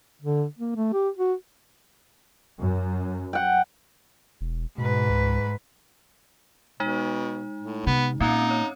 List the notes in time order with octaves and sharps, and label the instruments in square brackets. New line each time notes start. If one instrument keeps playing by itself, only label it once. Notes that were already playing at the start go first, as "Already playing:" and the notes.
[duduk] D3
A#3
A3
G4
F#4
[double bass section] F#2
[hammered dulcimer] F#5 G5
[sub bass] E1
[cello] G#2 B4 [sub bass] B2
[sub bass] C#2
[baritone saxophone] B2 [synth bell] G#3 D#4
[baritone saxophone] A2
[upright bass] C3 [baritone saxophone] B3
[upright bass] A#2 [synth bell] C4 C#4 F#6 [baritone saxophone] D#4
[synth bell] C#5